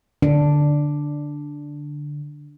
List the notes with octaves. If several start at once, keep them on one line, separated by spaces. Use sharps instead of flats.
D3 D4